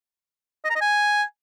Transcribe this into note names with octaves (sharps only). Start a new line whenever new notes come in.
D#5
A#5
D#5
G#5